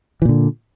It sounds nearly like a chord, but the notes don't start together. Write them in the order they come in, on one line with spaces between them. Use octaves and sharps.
E3 A#2 D3